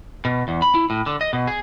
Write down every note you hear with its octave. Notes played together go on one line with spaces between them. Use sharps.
B2
E2
B5
E4
A2
D3
D#5
B2
G#4